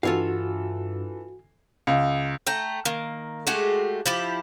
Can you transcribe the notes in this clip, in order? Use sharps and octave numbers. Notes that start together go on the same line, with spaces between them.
G2 E3 F4 F#4 A4 C#5 F5
C#2
A3 G5 A#5
D#3 A#3
G#3 A3 F#4 G4
F3 E4 G4